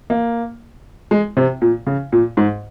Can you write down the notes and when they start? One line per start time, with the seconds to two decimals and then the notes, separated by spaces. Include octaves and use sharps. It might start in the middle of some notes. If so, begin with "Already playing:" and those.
0.10 A#3
1.11 G#3
1.37 C3
1.62 A#2
1.87 C#3
2.12 A#2
2.37 G#2